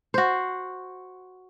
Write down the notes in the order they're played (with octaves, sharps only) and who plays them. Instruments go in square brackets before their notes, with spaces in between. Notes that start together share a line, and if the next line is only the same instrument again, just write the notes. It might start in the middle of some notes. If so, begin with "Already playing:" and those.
[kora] F#4 C5